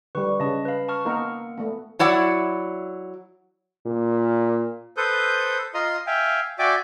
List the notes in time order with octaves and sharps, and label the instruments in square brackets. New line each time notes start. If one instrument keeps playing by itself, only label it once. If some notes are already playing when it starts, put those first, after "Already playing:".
[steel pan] D3 G3 [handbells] B4 C#6
[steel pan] C#3 [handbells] D#5 A5
[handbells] B4 F5
A5 C#6 F6
[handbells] A#3 F#5 [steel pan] B3 D#4 A#4
[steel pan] A3 B3
[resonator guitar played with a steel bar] F#3 E4 D5 F#5
[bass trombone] A#2
[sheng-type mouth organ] A4 B4 C5 D#6 G6
F4 D#5 A#5 C6 D#6
E5 F5 G5 G#5
F#4 D5 E5 G5 G#5 D6